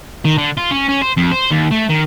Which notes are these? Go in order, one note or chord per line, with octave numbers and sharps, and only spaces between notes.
D#3
D3
F4
C#4
C#4
C5
F2
C5
D#2
A3
D#3